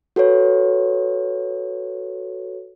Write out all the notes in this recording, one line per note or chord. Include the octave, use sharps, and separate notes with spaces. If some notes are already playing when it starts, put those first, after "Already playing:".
F#4 A4 B4 C#5